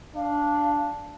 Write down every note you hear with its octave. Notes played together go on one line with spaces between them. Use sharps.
D4 F5